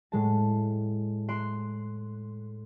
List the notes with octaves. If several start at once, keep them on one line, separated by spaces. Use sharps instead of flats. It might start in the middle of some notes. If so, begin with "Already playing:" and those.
A2 G#3 A5
C6 F#6 D7 E7